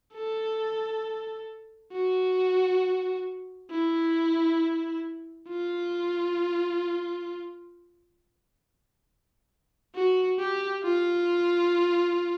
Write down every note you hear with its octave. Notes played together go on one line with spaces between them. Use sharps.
A4
F#4
E4
F4
F#4
G4
F4